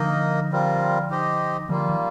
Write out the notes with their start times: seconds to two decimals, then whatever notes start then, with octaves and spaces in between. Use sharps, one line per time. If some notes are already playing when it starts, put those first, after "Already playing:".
Already playing: D3 F3 A#3 D#4 A#4 D#5
0.51 G3 C4 F4 A#4
1.10 D#4 G4 C5 D#5
1.69 D3 F3 G3 A#3 F4
1.89 D#3